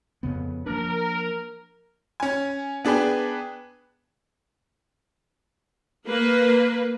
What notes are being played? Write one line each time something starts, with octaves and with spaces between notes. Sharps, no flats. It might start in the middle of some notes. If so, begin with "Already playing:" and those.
F2 C#3 B3
F3 A#3 D4 A#4
C#4 G#5
B3 D4 G#4 B4 G5
A#3 B4